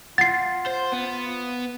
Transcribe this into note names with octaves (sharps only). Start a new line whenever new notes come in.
F4 F#5 A6 C7
C5
B3